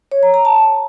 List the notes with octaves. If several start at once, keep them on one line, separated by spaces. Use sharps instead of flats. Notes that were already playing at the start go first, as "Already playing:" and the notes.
C#5
A#5
A#5
A5